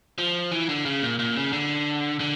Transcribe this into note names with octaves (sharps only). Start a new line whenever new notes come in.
F3
E3
D3
C#3
A#2
A#2
C#3
D3
D3